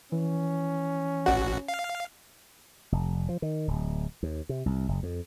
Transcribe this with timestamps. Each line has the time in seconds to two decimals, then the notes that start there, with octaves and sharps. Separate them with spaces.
0.12 E3 C#4
1.26 A1 F#4 D5 F#5
1.68 F5
2.92 F1
3.29 F3
3.42 D#3
3.68 D1
4.23 D#2
4.49 C3
4.66 C2
4.88 F#1
5.03 F2